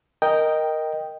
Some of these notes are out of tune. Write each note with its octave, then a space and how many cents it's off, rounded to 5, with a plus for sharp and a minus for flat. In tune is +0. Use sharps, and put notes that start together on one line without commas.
A#4 +0 D#5 +0 G5 +0